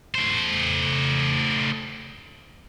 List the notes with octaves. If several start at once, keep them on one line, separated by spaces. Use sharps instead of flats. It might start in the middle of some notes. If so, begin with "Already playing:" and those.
A3 C5